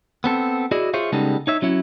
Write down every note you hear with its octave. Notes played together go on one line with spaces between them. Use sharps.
B3 C4 A4
E4 F#4 G#4 D5 D#5
F4 G#4 C5 C#5 E5 F5
C#3 G3 G#3 B3 D#4 A4
D#4 C#5 E5
F#3 C#4 E4